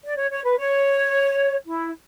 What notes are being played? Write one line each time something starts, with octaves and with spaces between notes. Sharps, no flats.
D5
C#5
C#5
B4
C#5
E4